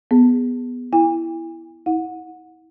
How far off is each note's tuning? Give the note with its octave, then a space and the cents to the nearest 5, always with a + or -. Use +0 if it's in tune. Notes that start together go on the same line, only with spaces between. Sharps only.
B3 +0 G#4 -10
E4 +0 G#5 -45
E4 -35 F#5 -20